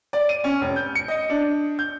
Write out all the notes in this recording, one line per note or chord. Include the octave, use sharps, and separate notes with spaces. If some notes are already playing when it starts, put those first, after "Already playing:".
D5
D#7
C#4
F1
G6
C#7
D#5
D4
G6